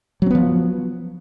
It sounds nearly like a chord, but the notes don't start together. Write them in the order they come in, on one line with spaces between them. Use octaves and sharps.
F#3 C4 B3 F3